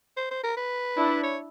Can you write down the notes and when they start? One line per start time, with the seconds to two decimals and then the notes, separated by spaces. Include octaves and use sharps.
0.17 C5
0.31 C5
0.44 A#4
0.57 B4
0.97 D4 E4
1.24 C#5